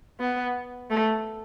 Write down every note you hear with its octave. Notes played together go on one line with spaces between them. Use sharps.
B3
A3